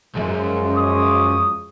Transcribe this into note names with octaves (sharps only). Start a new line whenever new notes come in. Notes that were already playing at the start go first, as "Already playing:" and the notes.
B1 F#2 C#3 F3 G#3
C#5 D6 D#6